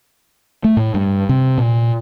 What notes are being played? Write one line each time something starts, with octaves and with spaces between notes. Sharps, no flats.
A3
A2
G2
C3
A#2